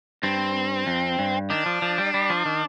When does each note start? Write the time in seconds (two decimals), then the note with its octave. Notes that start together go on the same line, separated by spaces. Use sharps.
0.23 G2 C4
0.87 F2
1.19 G2
1.50 D#3 D4
1.66 F3
1.82 F3
1.98 G3
2.14 G3
2.30 F3
2.45 D#3